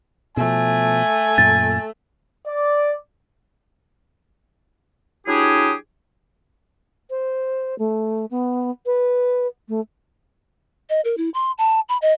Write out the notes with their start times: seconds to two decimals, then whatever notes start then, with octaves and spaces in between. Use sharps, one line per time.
0.37 B2 F3 A3 G#5
1.38 F#2 A#2 A6
2.47 D5
5.27 F#3 D4 E4 G4 G#4
7.10 C5
7.79 A3
8.31 B3
8.86 B4
9.69 A3
10.90 D#5
11.05 A#4
11.17 E4
11.34 C6
11.58 A5
11.89 B5
12.02 D#5